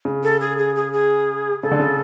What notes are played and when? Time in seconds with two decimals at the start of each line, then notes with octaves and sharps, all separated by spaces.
0.05 C#3
0.23 A4
0.41 G#4
0.58 G#4
0.75 G#4
0.93 G#4
1.63 C#3 A4
1.71 D3
1.80 C#3